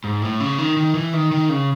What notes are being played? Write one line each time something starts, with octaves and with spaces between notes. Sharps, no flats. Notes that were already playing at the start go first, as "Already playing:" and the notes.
G#2
A2
C#3
D#3
D#3
E3
D#3
D#3
C#3